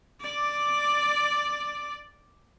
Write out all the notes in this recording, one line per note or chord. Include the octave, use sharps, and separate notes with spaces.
D5 D6